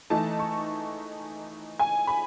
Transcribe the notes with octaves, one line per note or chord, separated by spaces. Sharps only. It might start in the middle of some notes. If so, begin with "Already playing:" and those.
E3 A3 D#4 A5
C#6
G#5
B5